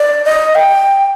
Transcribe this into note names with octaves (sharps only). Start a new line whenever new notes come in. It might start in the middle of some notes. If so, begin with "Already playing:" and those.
Already playing: D5
D#5
G5